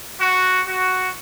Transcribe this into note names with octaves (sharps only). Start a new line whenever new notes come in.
F#4
F#4